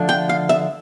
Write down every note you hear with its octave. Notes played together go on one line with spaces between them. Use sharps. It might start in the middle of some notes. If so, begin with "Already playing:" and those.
Already playing: D3 F3 A3 D4
G5
F5
E5